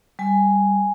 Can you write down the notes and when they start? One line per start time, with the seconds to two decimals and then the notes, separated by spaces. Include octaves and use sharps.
0.19 G3 G#5